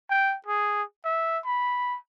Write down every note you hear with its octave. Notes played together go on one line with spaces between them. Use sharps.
G5
G#4
E5
B5